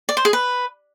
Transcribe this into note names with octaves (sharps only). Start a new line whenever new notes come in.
D5
C5
G#4
B4